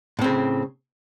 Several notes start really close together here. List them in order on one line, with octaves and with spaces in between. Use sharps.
A2 C4 C#3